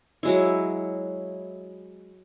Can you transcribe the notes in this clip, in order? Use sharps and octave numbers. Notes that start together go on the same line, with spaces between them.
F#3 G#3 E4